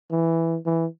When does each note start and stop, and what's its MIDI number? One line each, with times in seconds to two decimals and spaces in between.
0.11 0.58 52
0.66 0.86 52